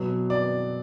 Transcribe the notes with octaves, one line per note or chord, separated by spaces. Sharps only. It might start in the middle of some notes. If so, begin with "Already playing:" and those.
Already playing: B2 F#3
D5